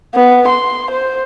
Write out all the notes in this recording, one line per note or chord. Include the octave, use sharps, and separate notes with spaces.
B3
C6
C5